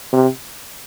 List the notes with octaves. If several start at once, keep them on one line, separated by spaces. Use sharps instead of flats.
C3